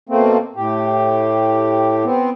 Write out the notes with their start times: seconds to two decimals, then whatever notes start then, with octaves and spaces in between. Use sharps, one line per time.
0.09 B2 A3 A#3 C4
0.56 A2 G4
2.04 B3 C4